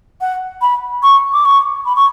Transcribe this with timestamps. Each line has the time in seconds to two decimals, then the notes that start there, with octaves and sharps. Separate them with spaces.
0.21 F#5
0.62 B5
1.03 C#6
1.33 D6
1.45 C#6
1.86 B5
1.96 C#6